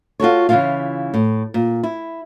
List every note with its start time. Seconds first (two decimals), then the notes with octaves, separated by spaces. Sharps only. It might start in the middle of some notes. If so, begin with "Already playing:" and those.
0.20 F4 F#4 A4 C#5
0.49 C#3 E3 A#3 E4 F4 F5
1.14 A2
1.54 A#2
1.83 E4